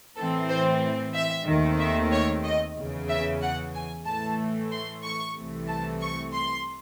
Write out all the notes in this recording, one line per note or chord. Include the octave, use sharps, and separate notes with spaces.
A2 E3 C4 A4
C5
E5
D#2 D#3 A3 C4
E5
C#5
D#5
E2 C#3 E3
E5
F#5
G#5
A2 E3 A3 A5
C6
C#6
C2 C3 E3 A3
A5
C#6
C6